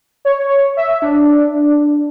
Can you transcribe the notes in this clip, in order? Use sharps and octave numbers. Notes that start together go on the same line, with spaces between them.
C#5
E5
D4